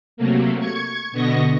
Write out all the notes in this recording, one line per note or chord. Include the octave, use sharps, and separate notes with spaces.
C3 F#3 A3 A#3
C#6 G#6 C#7
B2 D3 B3 D#5 C#6 A#6